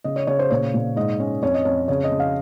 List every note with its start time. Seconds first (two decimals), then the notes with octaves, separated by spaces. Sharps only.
0.04 C#3 D#5
0.16 C#5
0.27 C#3 C#5
0.39 C5
0.50 A#2 C#5
0.74 A#2
0.96 G#2 D#5
1.20 C#4
1.43 F2 C#5
1.54 D#5
1.65 F2 C#5
1.88 C#3 C#5
2.04 D#5
2.12 C#3
2.20 F5